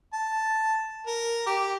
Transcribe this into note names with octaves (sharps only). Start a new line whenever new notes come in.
A5
A#4
G4